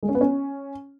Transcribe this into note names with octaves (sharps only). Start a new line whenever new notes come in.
G#3
C#4
B3
C#4